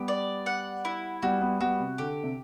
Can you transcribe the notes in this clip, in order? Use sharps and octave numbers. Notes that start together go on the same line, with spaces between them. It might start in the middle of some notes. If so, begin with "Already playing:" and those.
Already playing: G3 B3 G4
D5
F#5
E4
G3 B3 F#4
G3 B3
G3 B3 F#4
C3
D3 G4
C3